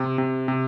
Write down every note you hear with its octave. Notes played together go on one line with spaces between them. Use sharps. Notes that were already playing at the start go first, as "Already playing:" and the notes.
Already playing: C3
C3
C3